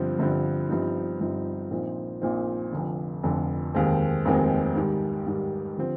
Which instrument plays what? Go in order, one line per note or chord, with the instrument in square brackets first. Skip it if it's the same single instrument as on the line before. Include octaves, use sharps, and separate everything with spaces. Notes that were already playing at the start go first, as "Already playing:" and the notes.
Already playing: [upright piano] G1 G2 D3 F3 C4
G1 G2 D3 F3 C4
G1 G2 F3 C4 D#4
G1 G2 F3 C4 D#4
A#1 A#2 F3 C4 D#4
A#1 A#2 F3 C4 D#4
F1 F2 D3
F1 F2 D3
F1 D#2 D#3 G#3 C4
F1 D#2 D#3 G#3 C4
G#2 D#3 G3
G#2 D#3 G3
D3 F3 C4